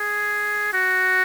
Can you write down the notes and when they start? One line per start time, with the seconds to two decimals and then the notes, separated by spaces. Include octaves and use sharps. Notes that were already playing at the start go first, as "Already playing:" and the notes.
Already playing: G#4
0.74 F#4